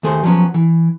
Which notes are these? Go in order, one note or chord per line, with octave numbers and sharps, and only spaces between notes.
D#2 D#3 A3 G#4 C5
F3 F#3 B3 C#4
E3